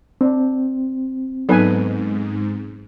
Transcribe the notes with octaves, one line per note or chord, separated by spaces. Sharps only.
C4 D4
G#2 F#3 B3 D#4 A4 B4 G#5